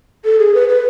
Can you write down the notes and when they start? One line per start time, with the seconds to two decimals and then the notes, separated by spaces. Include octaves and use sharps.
0.25 A4
0.39 G#4
0.54 B4
0.69 B4